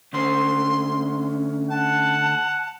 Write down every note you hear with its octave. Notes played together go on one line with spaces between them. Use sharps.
D2 C#4 C5 C6
F#5 A5